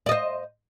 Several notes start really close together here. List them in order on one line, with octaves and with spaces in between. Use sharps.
D5 D#5 C5